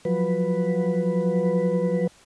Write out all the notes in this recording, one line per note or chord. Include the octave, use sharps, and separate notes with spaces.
F3 F#3 B4